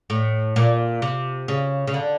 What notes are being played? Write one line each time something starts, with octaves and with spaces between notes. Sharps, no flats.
A2
A#2
C3
C#3
C#3
D3